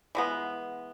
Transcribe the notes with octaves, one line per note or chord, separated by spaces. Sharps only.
E3 G#3 B3